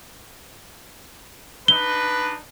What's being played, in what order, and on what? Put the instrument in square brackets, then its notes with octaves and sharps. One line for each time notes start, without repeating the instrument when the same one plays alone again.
[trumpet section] D4 D#4 B4 [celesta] G7